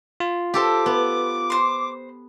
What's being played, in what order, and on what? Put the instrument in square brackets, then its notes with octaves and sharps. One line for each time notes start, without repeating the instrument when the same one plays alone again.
[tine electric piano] F4
[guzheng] G4 A4 C5 [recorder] D6
[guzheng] B3
[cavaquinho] C5 C6